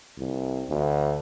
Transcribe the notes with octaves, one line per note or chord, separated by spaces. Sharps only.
C2
D2